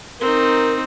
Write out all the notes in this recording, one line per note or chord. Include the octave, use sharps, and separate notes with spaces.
C4 D#4 A#4